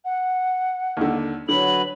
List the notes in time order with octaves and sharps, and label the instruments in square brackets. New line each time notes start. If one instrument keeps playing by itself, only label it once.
[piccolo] F#5
[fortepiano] D#2 D3
[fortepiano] D3 [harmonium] F#3 B4 [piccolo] F#7